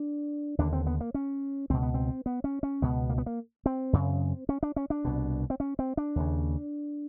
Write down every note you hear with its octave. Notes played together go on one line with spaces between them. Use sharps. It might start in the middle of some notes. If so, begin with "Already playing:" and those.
Already playing: D4
D#2 D3 D4
C4
B3
A#3
C#4
C#2 B2 C4
B3
C4
B3
C#4
C#4
C#2 B2 B3
A#3
B3
A#3
C4
F#2 C#3
C#4
D4
C#4
D4
C2 B2
C4
C#4
C4
D4
D#2 C#3